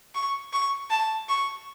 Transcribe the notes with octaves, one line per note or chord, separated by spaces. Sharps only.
C#6
C#6
A5
C#6